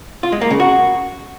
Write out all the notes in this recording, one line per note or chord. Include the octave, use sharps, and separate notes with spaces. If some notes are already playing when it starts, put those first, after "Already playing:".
F4
G#3
A#3
C#3
F#4